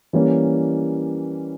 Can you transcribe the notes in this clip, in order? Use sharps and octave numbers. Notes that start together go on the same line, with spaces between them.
E3 G3 A#3 C#4